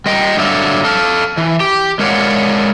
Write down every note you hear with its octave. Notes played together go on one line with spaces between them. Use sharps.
G3 D#5 G5
G2 D3 F#3 D5 E5 F5
A4 F5
E3
G4
G#3 A#4 C#5 D5 F5 F#5